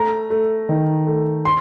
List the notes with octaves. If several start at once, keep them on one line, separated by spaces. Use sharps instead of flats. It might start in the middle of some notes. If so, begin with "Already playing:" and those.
Already playing: A3 A#5
A3
D#3
A3
C6